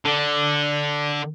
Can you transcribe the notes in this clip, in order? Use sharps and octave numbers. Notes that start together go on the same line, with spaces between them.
D3